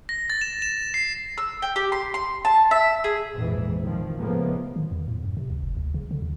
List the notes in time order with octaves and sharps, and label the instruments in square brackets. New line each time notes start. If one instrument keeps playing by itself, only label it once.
[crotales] A#6
A6
E7
E7
C7
[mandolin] E6
G5
G4
C6
C6
A5
E5
G#4
[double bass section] A#1 F2 G#2 E3
D#3 F3
A2 C#3 F3 G#3 A#3 B3
[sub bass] D#3
E2
A2
F#2
C3
D2
F#1
D2
C#3
D3
D#2